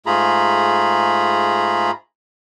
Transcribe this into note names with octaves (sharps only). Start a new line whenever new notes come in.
G#2 A3 F4 G#4 A#5 B5